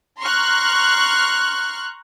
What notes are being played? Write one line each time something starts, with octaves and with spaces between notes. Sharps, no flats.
A#5 C6 C#6 F6 F#6